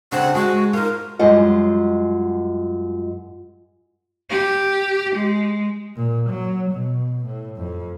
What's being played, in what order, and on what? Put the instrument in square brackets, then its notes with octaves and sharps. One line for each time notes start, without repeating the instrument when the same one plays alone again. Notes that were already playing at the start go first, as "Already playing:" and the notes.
[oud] C#3 C4 D4 [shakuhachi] F#5
[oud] G#3 [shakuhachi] F#4
[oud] D#4 F4 [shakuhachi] A#4
[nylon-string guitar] F#2 G3 G#3 F4 D#5 F#5
[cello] G4
G#3
[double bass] A#2
F#3
B2
A2
F2